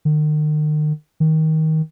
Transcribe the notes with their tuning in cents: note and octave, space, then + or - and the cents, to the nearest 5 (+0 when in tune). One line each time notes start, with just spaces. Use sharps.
D#3 -40
D#3 +20